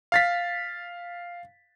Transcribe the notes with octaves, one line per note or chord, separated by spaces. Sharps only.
F5 A6 B6